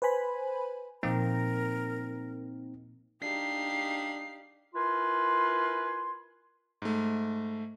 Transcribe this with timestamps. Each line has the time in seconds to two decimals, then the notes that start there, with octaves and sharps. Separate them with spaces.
0.02 B4 C5 G#5 B5
1.03 A#2 F3 A#3 C4 D#4 A#4
3.22 D4 D#4 G4 F5 C7
4.74 E4 F4 A#4 B4 G#5 C6
6.82 G#2 A3